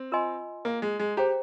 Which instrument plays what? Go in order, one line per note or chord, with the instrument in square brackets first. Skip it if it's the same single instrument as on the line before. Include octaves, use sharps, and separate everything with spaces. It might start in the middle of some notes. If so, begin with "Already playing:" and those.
Already playing: [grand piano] C4
[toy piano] F4 A#4 D#5 G#5 C6
[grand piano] A#3
G#3
G#3
[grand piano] G4 [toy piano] G#4 C5 G5 A#5